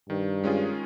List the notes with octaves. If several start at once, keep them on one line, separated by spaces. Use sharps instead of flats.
G2 D#3
G#3 C#4 F4 G#4